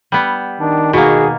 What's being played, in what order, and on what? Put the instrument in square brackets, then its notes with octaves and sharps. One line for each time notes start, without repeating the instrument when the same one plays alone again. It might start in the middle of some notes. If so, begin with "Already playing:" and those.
[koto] G3 B3
[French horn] D#3 [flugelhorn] D4
[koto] B2 A#3 [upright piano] F#4 [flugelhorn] G#4